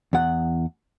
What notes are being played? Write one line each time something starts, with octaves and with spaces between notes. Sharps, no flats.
E2 F#5